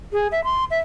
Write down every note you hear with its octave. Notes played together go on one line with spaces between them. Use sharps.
G#4
E5
C6
E5